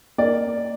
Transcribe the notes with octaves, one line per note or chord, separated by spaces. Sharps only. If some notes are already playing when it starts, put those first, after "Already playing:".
A#3 D5